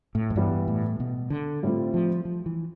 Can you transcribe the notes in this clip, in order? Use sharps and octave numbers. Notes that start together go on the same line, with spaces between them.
A2
F2
G2 E3 G3 B3
A2
B2
D3
A2 G3 C4 F4
F3
F3
E3